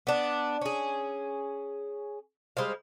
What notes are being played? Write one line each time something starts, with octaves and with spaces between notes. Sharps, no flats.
B3 D4
C#4 G#4
G3 G#3 C5 F5